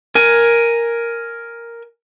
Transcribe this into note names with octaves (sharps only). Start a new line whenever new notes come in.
A#4 G#5